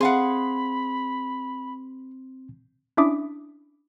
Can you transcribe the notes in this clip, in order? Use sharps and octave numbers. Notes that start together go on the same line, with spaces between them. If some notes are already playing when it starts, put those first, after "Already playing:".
C4 G#4 F5 F#5 B5 C6
C#4 D4 E4 E5 D6 D#6